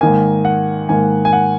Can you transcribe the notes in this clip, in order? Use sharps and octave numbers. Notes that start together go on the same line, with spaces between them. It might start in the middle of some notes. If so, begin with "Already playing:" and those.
G#2 D#3 A#3 G#5
F#5
G#2 D#3 A#3 G#5
G#5
F#5